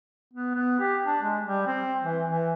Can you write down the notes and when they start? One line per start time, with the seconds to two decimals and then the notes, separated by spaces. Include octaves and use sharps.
0.33 B3
0.55 B3
0.79 G4
1.05 D4
1.23 G#3
1.44 G3
1.67 C4
2.03 E3
2.27 E3